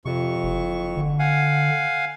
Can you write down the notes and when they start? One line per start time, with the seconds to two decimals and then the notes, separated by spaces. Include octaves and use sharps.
0.05 F2 C3 C#6
0.44 F#1
0.97 D3
1.19 F5 F#5 G#5